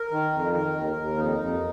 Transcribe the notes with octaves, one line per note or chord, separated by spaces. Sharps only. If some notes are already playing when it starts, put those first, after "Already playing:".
Already playing: A#4
D#3
F2
D#3 A#4
D#2
D#2
F2 D#4
F2